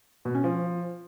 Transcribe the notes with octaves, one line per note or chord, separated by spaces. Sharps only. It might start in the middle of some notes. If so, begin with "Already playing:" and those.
B2
C#4
F3